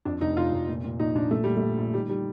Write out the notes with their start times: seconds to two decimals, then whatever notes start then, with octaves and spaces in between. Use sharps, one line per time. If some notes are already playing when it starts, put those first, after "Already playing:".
0.05 F2 D4
0.21 F1 D#4
0.37 F1 F4
0.52 F1
0.68 A#2
0.84 A#2
0.99 A#1 D#4
1.15 A#1 D4
1.31 A#2 A3
1.44 A#2 G3
1.57 A3
1.62 A#1
1.78 A#1
1.94 D#3 G3
2.09 D#3 G3